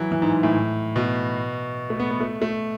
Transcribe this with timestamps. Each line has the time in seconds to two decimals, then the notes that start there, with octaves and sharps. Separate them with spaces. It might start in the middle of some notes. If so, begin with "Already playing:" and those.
Already playing: E3 F#3
0.12 E3
0.22 G#2
0.33 G#2
0.43 A2
0.96 B2
1.90 A3
2.00 B3
2.10 B3
2.20 A3
2.42 A3